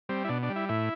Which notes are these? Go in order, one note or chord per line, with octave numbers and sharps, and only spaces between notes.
G3 C4
E4
B2 D4
D4
G3
E4
A2 E4